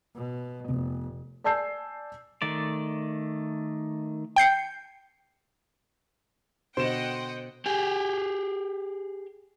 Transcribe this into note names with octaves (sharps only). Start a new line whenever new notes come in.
B2
F1 C3 B3
D5 G#5 A5 E6 G6 C7
D#3 A3 D5
G5 G6 C7 C#7
B2 D3 C5 D#5 F#5 G5 E7
G4 G#4